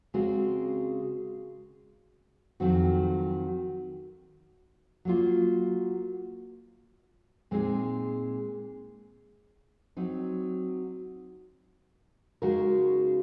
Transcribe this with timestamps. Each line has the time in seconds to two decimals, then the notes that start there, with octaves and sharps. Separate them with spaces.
0.14 C#3 G#3 C4 F#4 A#4
2.60 F2 D#3 F#3 C4 F#4
5.05 F#3 A#3 F4
7.51 A#2 G#3 C4 D#4 G#4
9.97 F#3 C4 D#4
12.42 C#3 G#3 D#4 F#4 A#4